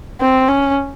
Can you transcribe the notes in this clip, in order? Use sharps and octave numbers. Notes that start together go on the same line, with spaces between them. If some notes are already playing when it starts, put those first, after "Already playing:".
C4
C#4